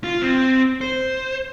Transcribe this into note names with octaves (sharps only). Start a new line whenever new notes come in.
F4
C4
C5